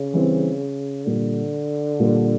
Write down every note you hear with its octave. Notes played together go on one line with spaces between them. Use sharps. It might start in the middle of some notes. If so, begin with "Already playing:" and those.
Already playing: C#3
E3 G3 C4
A#2 D3 G3 A#3
A#2 G3 A#3